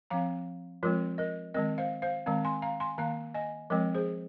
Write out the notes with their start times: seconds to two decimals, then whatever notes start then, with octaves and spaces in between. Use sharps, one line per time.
0.10 F3 C4 F5 A#5
0.83 F3 G#3 C4 F4 A#4
1.18 A#4 D#5
1.54 D#3 G#3 C4 A#4 D#5
1.78 C5 F5
2.02 C5 F5
2.26 D#3 G#3 C4 F5 A#5
2.44 G#5 C6
2.62 F5 A#5
2.80 G#5 C6
2.98 D#3 A#3 F5 A#5
3.34 D#5 G#5
3.70 F3 G#3 C4 A#4 D#5
3.94 G#4 C5